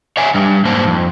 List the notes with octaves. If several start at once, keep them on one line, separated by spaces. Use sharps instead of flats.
C#5 D5 E5 G#5
G3 D4
G#2 A#3 D4 D#4 C5
F2